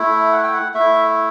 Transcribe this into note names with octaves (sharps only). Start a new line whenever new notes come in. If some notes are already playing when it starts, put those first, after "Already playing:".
Already playing: A3 E4
F#5
G5
F#5
A3 E5
E4